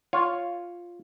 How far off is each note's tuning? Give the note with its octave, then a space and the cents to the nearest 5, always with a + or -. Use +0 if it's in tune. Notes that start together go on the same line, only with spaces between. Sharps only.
F4 +0 C#5 +0